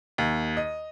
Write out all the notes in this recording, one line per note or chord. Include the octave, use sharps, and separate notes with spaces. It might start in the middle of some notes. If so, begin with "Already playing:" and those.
D#2
D#5